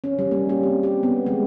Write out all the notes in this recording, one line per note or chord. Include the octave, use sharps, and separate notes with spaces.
C#4
G3
A#3
G4
C4
G4
B3
G#3